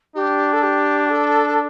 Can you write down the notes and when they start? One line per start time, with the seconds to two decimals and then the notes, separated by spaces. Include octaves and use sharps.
0.15 D4 G4
0.53 A4
0.63 G4
1.10 A4